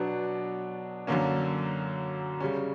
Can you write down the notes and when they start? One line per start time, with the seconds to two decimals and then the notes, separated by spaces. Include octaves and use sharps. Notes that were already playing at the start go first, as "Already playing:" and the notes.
Already playing: B2 F#3 B3 D4
1.07 F#2 D3 A#3 C#4
2.40 C#3 G3 C#4